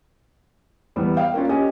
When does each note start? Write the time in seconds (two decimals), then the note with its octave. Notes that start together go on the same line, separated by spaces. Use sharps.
0.96 E2 G3 B3
1.17 F5 G5
1.34 A#3 C#4 D4 F4
1.49 C#4 G4 D#5 G#5